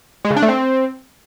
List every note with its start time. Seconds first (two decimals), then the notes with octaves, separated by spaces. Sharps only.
0.25 G#3
0.30 C#3
0.36 D4
0.42 A3
0.48 C4